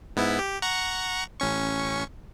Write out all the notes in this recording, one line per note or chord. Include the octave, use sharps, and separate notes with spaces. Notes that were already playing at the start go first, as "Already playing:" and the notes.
G#2 B3 E4
G4
F#5 A#5 C#6
A1 C#4 C#6